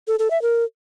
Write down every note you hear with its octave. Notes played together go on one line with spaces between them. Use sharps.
A4
A4
E5
A#4